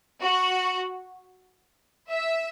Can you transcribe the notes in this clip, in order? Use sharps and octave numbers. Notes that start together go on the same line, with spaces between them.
F#4
E5